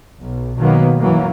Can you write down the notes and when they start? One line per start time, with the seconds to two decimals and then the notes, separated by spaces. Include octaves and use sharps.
0.23 B1
0.57 B2 D#3 F#3 A#3 B3
1.00 F#2 E3 F#3 A#3